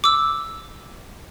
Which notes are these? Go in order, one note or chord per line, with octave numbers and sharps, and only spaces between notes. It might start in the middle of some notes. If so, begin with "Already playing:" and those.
D6 E6